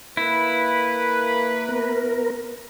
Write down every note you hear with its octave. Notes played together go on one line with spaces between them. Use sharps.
A#3 E4 B4
B3 A#4